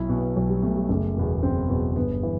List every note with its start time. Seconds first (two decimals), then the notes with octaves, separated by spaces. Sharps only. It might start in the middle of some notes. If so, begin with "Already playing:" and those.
Already playing: B1 E4
0.09 B2
0.18 B3
0.36 B1 F#3
0.49 G3
0.63 B2 A3
0.76 G3
0.89 F#1 A3
1.16 E2 B2
1.43 F#1 C4
1.69 E2 B2
1.96 G1 B3
2.23 E3